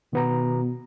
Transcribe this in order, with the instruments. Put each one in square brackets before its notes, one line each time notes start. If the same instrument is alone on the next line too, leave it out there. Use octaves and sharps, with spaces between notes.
[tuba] B2 [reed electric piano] D#3 B3 A#5